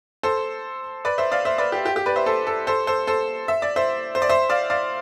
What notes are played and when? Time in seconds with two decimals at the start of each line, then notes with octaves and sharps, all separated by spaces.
0.23 A4 C5
1.05 B4 D5
1.18 C5 E5
1.32 D5 F5
1.45 C5 E5
1.58 B4 D5
1.72 G4
1.86 G4
1.96 G4
2.06 B4 D5
2.16 C5 E5
2.26 A4 C5
2.47 A4
2.67 A4 C5
2.87 A4 C5
3.07 A4 C5
3.48 E5
3.62 D5
3.76 C5 E5
4.15 C5
4.22 D5
4.29 C5 E5
4.50 D5 F5
4.70 D5 F5